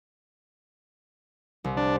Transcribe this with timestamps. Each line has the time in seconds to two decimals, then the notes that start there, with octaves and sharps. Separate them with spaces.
1.64 C2
1.77 D4